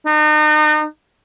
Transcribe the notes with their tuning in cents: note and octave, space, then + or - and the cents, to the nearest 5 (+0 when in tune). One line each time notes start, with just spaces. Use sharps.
D#4 -40